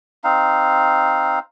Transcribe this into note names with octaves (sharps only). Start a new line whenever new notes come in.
C4 D#4 F5